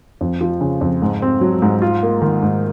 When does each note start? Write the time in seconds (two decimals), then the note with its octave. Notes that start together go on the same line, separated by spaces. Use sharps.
0.21 F2
0.41 F3
0.61 C#3
0.81 F2
1.02 G#2
1.22 C4
1.41 F#3
1.62 G#2
1.82 F4
2.03 A#3
2.22 D#3
2.43 G#2